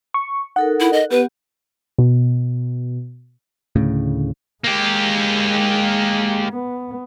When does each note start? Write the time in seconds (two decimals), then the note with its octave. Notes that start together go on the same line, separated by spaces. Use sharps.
0.14 C#6
0.56 D#4 A4 A#4 F#5
0.80 E4
0.93 D#5
1.10 B3 G4 B4
1.98 B2
3.76 D2 A2 C#3
4.64 G#3 A#3 G4
6.50 B3